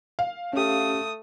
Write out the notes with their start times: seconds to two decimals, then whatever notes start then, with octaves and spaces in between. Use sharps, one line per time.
0.19 F5
0.53 A3 C#4 G4 D#6